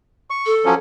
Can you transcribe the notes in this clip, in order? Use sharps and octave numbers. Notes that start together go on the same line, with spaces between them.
C#6
A4
F3 F#3 C#4